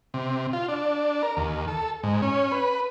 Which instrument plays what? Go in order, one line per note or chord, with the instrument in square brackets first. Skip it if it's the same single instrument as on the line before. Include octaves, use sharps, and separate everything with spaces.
[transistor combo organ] C3
F4
D4
A#4
D#2
A4
G#2
C#4
B4